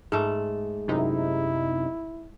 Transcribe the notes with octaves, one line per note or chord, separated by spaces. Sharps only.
G#2 A3 G#4
F#2 C3 D#4 E4